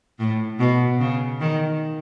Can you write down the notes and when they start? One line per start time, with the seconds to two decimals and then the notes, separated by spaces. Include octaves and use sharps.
0.19 A2
0.60 B2
1.00 C#3
1.40 D#3